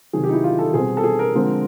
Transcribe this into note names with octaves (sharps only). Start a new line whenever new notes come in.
C3 D#3 F#3 G#4
G4
D#4
E4
F4
A4
B2 G3 C4 G#4
A4
G#4
A#4
D3 F3 G#3 C4